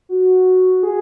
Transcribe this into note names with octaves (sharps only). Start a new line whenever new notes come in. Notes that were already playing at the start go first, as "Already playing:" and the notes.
F#4
G#4